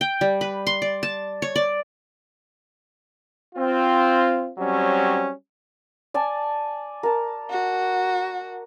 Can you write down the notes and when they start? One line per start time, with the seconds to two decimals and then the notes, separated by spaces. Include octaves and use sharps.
0.01 G5
0.21 G3
0.41 B4
0.67 C6
0.82 D5
1.03 A5
1.42 C#5
1.56 D5
3.55 C4 F4
4.57 F#3 G3 C4 C#4
6.14 D5 G#5 A5
7.03 A#4 A5
7.51 F#4